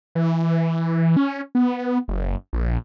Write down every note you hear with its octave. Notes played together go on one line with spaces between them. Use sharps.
E3
C#4
B3
F#1
A#1